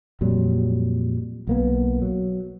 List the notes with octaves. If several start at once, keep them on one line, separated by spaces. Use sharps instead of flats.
F2 A#2 F#3 G3
B1 A#3 B3
F#3